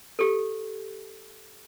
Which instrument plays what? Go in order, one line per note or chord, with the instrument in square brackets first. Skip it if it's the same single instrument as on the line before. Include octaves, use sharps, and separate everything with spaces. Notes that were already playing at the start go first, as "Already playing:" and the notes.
[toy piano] G4 A4